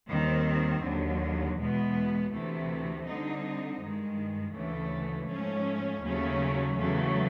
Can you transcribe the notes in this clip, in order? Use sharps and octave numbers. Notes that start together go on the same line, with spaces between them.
D#2 D#3 G3 C4
D#2 D3 F#3
E2 B2 G#3 B3
D2 C3 E3 A3
D3 G3 C4 D#4
G2 D#3 G#3
D2 C#3 E3 A3
G#2 F3 A3 C#4
D#2 C#3 F#3 A3 C#4
E2 C#3 F#3 A3